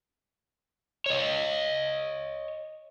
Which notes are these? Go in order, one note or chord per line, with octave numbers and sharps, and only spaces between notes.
C#5 D#5